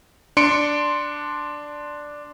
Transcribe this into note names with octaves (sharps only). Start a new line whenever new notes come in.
D4 C6 C#7 D7